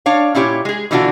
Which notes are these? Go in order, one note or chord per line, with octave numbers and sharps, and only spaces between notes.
D4 C#5 F5
A#2 C#4 E4 G4 C#5
G#3 G#4
B2 D3 E3 D4 F4 F#4